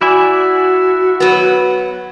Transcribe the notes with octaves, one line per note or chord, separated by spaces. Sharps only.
E4 F#4 D5 G#5
F#3 B3